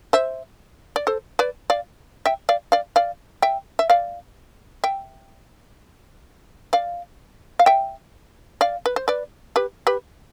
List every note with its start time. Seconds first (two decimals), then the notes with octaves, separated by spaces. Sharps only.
0.13 C5 E5
0.96 D5
1.07 A4 C5
1.39 B4 D5
1.70 D5 F5
2.26 E5 G5
2.49 D5 F5
2.72 D5 F5
2.96 D5 F5
3.42 E5 G5
3.79 E5
3.90 D5 F5
4.84 E5 G5
6.73 D5 F5
7.59 F5
7.66 E5 G5
8.61 D5 F5
8.86 B4
8.96 C5
9.08 B4 D5
9.56 G4 B4
9.87 G4 B4